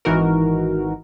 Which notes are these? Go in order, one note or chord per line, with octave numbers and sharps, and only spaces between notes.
G#1 E3 D#4 F#4 A#4